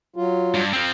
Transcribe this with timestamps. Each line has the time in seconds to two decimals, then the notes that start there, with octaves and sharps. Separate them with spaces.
0.16 F#3 F4
0.54 G2
0.73 F3 C4